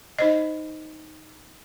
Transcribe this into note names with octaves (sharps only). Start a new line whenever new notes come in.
D#4 C5 D#5